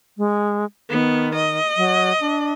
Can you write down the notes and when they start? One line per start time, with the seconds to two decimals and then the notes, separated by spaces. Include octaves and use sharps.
0.18 G#3
0.90 D#3 B3
1.35 D#5
1.77 F#3
2.20 D4